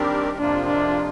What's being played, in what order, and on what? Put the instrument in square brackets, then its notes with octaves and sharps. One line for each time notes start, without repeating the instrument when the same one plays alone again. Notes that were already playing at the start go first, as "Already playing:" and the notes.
Already playing: [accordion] D#3 G3 C4 G4 A#4 [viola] D4
[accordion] F2 C3 F3 A#3 F4 [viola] D4
[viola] D4